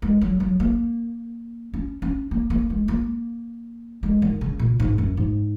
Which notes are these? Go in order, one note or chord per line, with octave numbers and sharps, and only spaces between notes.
G#3
F#3
F#3
A#3
C#4
C#4
A#3
A#3
G#3
A#3
G#3
D#3
C#3
A#2
G#2
F#2
G#2